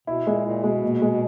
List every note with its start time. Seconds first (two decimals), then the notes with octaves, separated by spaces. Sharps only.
0.07 B2 E4
0.26 A#2 G#3
0.45 A#2 E4
0.64 B2 G#3
0.82 A#2
1.02 G#3